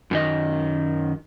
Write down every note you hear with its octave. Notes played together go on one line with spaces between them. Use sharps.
F#2 D#3 D#5